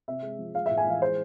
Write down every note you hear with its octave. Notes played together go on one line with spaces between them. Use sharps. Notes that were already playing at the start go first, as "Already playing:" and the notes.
C3 E5
G#3
F3
G#3 F5
A2 E5
G#5
E3 F5
G#3 C5